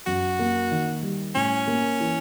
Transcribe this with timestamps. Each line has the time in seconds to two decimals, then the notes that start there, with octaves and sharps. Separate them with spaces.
0.06 F#2 F#4
0.39 A#3
0.71 D#3
1.03 G3
1.35 A2 C#4
1.67 A#3
2.00 E3